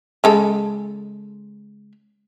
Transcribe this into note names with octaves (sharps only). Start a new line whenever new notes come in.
C#3 G#3 A4